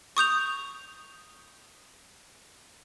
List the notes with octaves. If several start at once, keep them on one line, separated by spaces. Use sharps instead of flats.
C#6 D#6 G6 F7